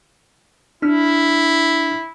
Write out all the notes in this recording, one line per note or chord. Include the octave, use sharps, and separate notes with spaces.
D4 E4 F6